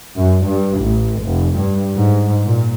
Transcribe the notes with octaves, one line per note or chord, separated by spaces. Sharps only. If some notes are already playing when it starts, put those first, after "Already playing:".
F#2
G2
A1
F1
G2
G#2
A#2